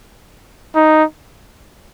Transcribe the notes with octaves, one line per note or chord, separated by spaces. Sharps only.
D#4